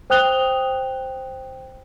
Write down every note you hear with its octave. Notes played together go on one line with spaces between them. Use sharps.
C5 G5 D#6 F#6 F7 G7